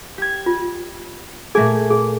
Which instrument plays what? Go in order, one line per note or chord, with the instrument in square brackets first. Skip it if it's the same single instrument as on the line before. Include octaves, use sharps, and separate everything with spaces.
[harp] G4 G#6
[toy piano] F4
[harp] A#2 A3 G#5 [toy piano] G#4 E5
[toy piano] G#4